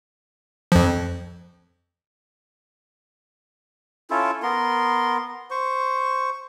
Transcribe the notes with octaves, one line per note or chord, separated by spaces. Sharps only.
F2 F3
C#4 E4 F4 A4
B3 A#4 C6
C5 C#6